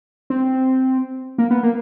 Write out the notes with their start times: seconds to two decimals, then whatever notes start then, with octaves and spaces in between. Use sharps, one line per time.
0.30 C4
1.38 A#3
1.51 B3
1.63 A#3